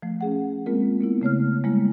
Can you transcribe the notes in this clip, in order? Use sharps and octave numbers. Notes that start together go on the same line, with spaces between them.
F3 A3
C#4 G#4 F#5
G#3 A#3 C4 F4 A#4
A#3 B3 E4
C#3 A3 C#5 F6
G3 G#3 A#3 E4